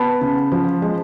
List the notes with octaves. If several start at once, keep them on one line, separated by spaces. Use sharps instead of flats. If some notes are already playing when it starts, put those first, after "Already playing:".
Already playing: B3 A5 B5
C#3
F3
G#3